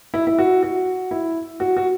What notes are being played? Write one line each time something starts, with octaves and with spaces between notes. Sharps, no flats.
E4
E4
F#4
F#4
E4
F#4
F#4